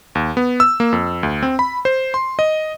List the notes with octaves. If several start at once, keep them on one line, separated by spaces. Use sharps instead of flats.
D#2
B3
E6
A#3
F2
D2
C4
B5
C5
C6
D#5